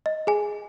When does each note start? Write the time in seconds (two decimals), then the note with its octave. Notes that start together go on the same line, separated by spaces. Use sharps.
0.06 D#5
0.27 G#4 G#5